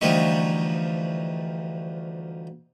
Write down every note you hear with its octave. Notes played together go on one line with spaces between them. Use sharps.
D2 E3 F3 G3 D#4 C#6